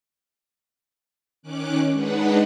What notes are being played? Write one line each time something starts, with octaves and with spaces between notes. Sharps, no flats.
D#3 C#4 D6 F#6
G#3 D4 D#4 B4 F#5